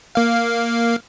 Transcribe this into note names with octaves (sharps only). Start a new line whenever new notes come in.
A#3 F5